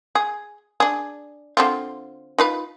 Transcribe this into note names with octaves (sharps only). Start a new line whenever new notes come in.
G#4
D4 G#4
D3 C4 F4
D#4 F4 B4